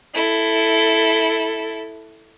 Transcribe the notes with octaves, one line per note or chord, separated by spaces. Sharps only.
E4 A4